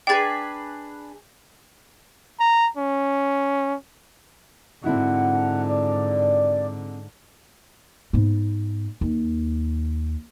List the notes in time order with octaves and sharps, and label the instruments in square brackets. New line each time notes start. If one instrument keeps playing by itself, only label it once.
[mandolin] D4 G#4 B4 [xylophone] G5 A6
[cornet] A#5
C#4
[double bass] G#2 D3 [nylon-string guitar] C4 E4 F#4 [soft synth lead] F#5
[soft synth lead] D5
[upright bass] G#2 B3
D#2